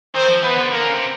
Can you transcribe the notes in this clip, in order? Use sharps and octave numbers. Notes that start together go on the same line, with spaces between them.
D#3 C4 C5
F3
E3 B3 B4
D3
D3 A#3 A#4
C#3
C3